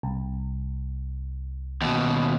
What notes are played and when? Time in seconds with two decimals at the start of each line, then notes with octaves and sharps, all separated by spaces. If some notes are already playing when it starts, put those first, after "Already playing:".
0.03 C2
1.82 D#2 B2